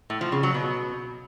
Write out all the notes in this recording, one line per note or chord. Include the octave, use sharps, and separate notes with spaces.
A2
F3
C#3
F#3
B2